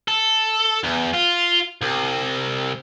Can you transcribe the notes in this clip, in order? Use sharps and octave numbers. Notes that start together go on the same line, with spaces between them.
A4
E2
F4
C2